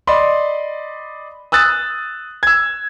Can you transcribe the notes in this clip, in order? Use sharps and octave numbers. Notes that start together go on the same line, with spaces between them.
D5 D#5 B5 C6
D#6 E6 F#6 A6
E6 G#6